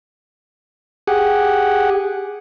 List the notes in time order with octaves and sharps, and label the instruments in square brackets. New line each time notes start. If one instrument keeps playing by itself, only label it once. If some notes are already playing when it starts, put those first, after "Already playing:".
[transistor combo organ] G4 G#4 F#5